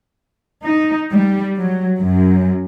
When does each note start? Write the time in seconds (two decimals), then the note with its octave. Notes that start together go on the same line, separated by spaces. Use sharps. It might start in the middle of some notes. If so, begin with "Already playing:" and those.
0.65 D#4
1.11 G3
1.59 F#3
2.00 F#2